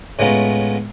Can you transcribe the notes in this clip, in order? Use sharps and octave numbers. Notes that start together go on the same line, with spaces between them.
A2 G#3 B3 C#4 F4 A#5